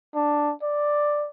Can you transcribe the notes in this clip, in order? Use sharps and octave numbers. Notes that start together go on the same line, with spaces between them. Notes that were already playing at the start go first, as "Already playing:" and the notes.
D4
D5